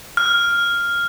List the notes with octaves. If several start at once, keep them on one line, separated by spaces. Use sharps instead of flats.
F6